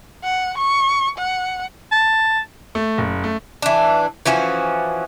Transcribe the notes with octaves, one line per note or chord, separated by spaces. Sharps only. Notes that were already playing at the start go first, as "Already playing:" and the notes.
F#5
C#6
F#5
A5
A3
F#1
A3
E3 D4
E3 F3 C#4 F#4